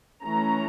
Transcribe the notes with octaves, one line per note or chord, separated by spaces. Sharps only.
E3 A3 C#4 A#5